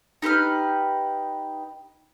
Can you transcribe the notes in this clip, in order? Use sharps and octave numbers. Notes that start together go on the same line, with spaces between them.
D#4 G4 B4 F6